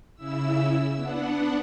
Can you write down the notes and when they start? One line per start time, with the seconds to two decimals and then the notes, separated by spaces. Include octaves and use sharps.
0.15 C#3 E4 E6
0.96 B3 D4 F#5